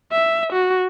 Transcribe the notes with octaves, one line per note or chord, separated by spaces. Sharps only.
E5
F#4